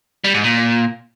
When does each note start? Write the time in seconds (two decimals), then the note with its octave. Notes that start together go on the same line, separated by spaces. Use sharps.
0.24 G3
0.34 G#2
0.44 A#2